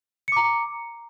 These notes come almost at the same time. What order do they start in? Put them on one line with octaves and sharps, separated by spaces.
C#7 D6 A#5